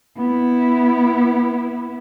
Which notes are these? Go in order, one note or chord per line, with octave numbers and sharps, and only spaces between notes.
B3 E4